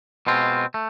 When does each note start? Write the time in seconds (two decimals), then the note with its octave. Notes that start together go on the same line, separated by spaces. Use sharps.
0.27 B2 G#3 C4 F4
0.74 A3